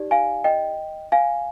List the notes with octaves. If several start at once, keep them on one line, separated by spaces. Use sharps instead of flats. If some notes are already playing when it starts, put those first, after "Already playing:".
Already playing: D#4 G4 D5
F5 G#5
D#5 G5
F5 G#5